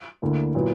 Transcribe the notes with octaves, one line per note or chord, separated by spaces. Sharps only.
D2 D3 A#3 E4
A#2 F#3 B3 E4